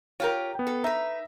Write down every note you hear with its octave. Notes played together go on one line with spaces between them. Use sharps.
F4 G4 A#4 C#5
B3 G5
A4
D#4 B4 E5 A#5